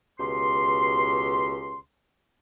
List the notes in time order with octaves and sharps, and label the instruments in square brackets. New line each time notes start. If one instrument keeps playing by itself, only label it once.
[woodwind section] C#2 B2 G4 C6